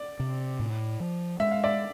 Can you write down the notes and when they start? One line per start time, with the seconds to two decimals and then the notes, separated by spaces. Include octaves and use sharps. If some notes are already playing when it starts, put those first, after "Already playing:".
Already playing: D5
0.20 C3
0.59 A2
1.00 F3
1.40 G#3 E5
1.51 F5
1.64 D5 E5